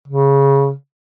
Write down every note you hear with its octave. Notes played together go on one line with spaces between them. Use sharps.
C#3